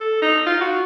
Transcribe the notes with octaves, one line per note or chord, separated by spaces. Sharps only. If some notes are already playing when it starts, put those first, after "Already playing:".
A4
D#4
F4
F#4